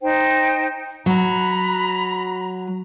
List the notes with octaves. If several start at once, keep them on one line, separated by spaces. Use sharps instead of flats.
D#4 C5 G5
F#3 A#5 B5